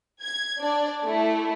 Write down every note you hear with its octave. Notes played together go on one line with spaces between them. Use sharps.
G#6
D4 D5
A3 E4